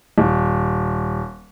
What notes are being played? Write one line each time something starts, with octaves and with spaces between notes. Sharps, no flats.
D#1